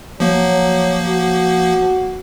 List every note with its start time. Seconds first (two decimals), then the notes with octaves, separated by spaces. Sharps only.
0.20 F3 F#3 A#3
1.08 F#4